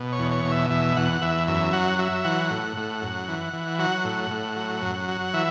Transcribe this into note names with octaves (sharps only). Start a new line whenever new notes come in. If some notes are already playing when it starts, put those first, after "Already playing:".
Already playing: B2
C#5
E2
C#5
B2
E5
E2 E5
E2 F#5
E2 E5
F#2 E5
F#3 F#5
F#3 E5
E3 F#5
A2
A2
F#2
E3
E3
F#3 F#5
A2
A2
F#3
F#2
F#3
E3 E5